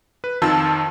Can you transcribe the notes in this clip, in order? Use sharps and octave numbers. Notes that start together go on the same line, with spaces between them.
B4
F2 D#3 F4 A5 E6